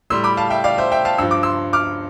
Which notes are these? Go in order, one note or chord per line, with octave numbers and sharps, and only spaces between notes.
A2 G3 C6 E6
B5 D6
F5 A5
E5 G5
D5 F5
C5 E5
E5 G5
F5 A5
G2 F3 E6
D6
C6 E6
D6 F6